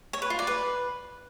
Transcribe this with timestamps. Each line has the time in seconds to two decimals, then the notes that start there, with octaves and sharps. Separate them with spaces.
0.13 C#5
0.22 B4
0.30 F4
0.39 D5
0.47 B4